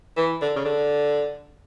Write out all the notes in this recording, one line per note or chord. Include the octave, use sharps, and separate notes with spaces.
E3
D3
C#3
D3